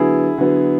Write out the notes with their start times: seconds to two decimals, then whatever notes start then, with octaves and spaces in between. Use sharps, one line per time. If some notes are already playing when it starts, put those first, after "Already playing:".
Already playing: D3 F#3 B3 E4 G#4
0.38 D3 F#3 B3